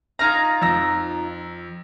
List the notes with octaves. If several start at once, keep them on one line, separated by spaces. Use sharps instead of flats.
D#4 F4 A#5 F6 G#6
F2 E6 A#6